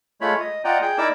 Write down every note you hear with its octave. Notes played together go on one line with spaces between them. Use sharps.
G#3 A3 F4 C#5 B5
D#5
F4 D5 D#5 F#5 G5 A#5
G#4 G5
D#4 E4 A#4 D5 D6 E6